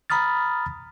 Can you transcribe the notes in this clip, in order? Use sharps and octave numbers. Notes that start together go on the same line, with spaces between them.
A#5 B5 D#6 F6 A6